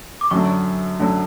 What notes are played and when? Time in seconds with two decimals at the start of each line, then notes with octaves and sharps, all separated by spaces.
0.21 D6
0.31 F#2 D3 F#3 C#6
0.99 F#2 D3 F#3